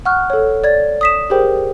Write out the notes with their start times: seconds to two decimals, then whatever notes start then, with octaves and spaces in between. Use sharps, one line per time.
0.05 F#5 C#6 F6 F#6
0.30 A4 C#5
0.64 D5 G#6 A6
1.01 D#6 B6 E7
1.30 G4 G#4 A#4 C5 G5